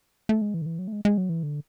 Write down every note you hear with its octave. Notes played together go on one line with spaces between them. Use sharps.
A3
G#3
E3
D3
E3
F#3
A3
G#3
G#3
F#3
E3
D3